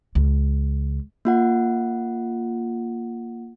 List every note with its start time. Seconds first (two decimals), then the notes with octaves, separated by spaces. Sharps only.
0.15 C#2
1.25 A#3 F4 F#5